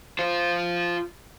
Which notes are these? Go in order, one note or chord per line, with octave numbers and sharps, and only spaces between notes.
F4 C5